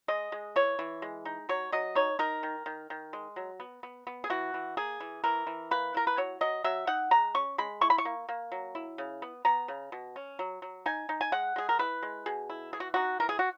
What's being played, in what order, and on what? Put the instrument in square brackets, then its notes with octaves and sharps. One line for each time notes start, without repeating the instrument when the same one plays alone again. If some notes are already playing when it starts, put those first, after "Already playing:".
[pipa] G#3 D#5
G#3
E3 C#5
E3
G#3
D#4
F#3 C#5
F#3 D#5
D#4 C#5
D#4 A#4
D#3
D#3
D#3
G#3
F#3
B3
B3
B3
G#4
E3 F#4
E3
A#3 G#4
E3
E3 A#4
E3
A#3 B4
E4 A#4
B4
F#3 C#5
F#3 D#5
F#3 E5
D#4 F#5
G#3 A#5
C#4 C#6
G#3 B5
E4 C#6
B5
C#6
A#3
A#3
F#3
E4
C#3
B3
B3 A#5
C#3
B2
C#4
F#3
F#3
D#4 G#5
D#4
G#5
G#3 F#5
G#3 G#4
A#4
E4 B4
G#3
B2 G#4
E4
E3 G#4
F#4
D#4 F#4
E3 A#4
G#4
F#4